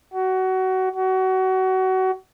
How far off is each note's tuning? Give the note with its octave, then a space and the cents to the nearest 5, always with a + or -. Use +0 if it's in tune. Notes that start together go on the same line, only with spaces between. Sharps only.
F#4 +20
F#4 +25